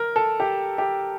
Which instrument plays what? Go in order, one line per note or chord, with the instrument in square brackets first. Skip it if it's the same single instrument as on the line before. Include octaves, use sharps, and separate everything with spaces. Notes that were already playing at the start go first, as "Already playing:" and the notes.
Already playing: [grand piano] A#4
A4
G4
G4